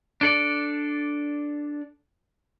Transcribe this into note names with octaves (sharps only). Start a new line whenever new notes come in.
D4 A4 D5